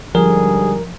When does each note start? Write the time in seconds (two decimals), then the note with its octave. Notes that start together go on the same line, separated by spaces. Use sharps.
0.15 G#2 D3 F3 G3 G#4 A#4